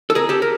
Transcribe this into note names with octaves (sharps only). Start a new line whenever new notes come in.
A4
G#4 A#4
G4 A4
A#4